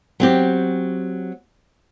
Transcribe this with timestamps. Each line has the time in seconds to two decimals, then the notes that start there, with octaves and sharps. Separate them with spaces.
0.20 F#3 C4 G4